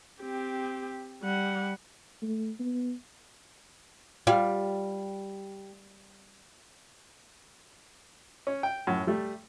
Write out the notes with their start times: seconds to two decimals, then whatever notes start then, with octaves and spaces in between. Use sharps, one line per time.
0.22 C4 G4
1.22 G3 F#5
2.22 A3
2.59 B3
4.27 G3 F4
8.47 C#4
8.63 G5
8.87 F#2 A2
9.07 G3 A3